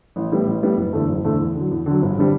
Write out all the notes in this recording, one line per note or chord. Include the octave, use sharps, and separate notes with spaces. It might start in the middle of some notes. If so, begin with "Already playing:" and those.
A1
A2 G3 B3
A1
A2 G3 B3
F#1
E2 D3 A3
F#1
E2 D3 A3
E2
D3 F#3
E2
D3 F#3
G1
D3 G3 C4